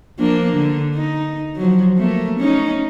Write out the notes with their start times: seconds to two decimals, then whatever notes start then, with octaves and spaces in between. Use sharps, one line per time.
0.19 F3 A#3 D4
0.53 D3
0.95 D#4
1.56 F3 F#3
1.97 A3 A#3
2.39 C#4 D#4